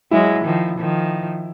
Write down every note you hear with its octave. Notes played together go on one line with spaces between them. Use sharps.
F#3 G#3 E4
D#3 F3
D#3 F3